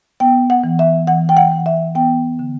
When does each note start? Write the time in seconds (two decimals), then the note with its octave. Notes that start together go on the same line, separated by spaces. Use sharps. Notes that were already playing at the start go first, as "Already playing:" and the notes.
0.20 B3 G5
0.50 F#5
0.64 E3
0.79 E5
1.07 E3 F#5
1.29 G5
1.37 F#5
1.52 E3
1.66 E5
1.95 B3 G5
2.39 D3